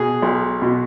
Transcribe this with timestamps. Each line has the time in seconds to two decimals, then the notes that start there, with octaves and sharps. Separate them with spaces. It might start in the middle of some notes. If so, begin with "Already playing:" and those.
Already playing: B2 G#4
0.22 B1
0.62 B2